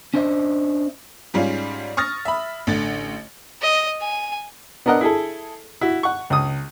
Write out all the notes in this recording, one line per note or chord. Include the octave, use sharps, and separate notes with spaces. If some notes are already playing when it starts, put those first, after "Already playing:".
C#4 D4 C5 D#5 E5
G#2 G3 C#4 F4
C#6 D#6 F6 A6 A#6
E5 B5
A1 D3 A6
D#5
G#5
B3 D4 A#4 D#5 F#5
E4 G#4 A4
E4 F#4
F#5 C#6
C#2 D#6